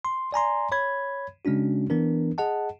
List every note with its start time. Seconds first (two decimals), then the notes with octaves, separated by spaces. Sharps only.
0.05 C6
0.32 D5 G#5 A#5 C6
0.72 C#5 B5 G#6
1.45 C#3 G#3 C#4 D4 F#4
1.90 E3 B3 D4 A#4
2.38 G#4 D#5 F#5 A5